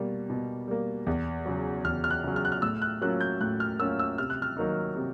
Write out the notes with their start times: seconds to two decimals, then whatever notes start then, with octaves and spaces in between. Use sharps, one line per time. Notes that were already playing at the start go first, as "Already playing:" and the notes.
Already playing: B2 G3 A#3
0.30 B2
0.68 G3 A#3
1.07 E2
1.45 C#3 F#3
1.85 E2 F6
2.04 F6
2.10 F#6
2.24 C#3 F#3
2.36 F6
2.45 F#6
2.52 F6
2.62 A2 E6
2.82 F#6
3.01 F#3 A#3 C#4 F4 F#6
3.20 G6
3.41 A2 F#6
3.60 F6
3.79 F#3 A#3 C#4 F4 E6
3.99 E6
4.18 C3 F6
4.30 F#6
4.42 F6
4.57 D#3 F#3 A#3 D#4
4.96 C3